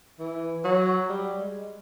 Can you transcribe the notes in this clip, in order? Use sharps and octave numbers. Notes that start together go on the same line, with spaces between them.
E3
F#3
G3
G#3